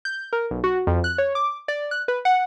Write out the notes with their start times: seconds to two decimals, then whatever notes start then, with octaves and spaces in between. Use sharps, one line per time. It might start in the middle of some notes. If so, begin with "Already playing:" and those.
0.05 G6
0.33 A#4
0.51 B1
0.64 F#4
0.87 F2
1.04 F#6
1.18 C#5
1.35 D6
1.68 D5
1.91 F#6
2.08 B4
2.25 F#5